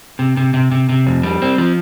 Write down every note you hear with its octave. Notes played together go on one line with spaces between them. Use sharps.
C3
C3
C3
C3
C3
F2
G3
C4
F3